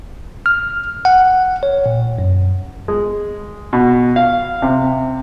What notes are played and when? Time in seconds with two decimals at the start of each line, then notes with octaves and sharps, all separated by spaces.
0.46 F6
1.05 F#5
1.63 C#5
1.86 A#2
2.19 F#2
2.88 G#3
3.73 B2
4.16 F5
4.62 C3